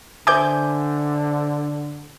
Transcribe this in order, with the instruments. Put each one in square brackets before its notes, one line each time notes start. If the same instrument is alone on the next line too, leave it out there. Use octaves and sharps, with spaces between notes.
[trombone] D3 [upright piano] C5 E5 [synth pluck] G#5 D6 G6